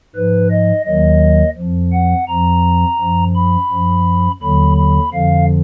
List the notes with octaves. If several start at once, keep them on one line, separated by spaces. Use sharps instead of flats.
G#2 F3 B4
D#5
D#2 D#3 F#3 D#5
F2 F3
F#5
F2 F3 A#5
F#2 F3
B5
F#2 F3
D#2 D3 F#3 B5
B5
F2 D3 F3 F5